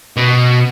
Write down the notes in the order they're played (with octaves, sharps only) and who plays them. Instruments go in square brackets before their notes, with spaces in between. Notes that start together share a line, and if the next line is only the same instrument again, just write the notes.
[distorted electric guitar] B2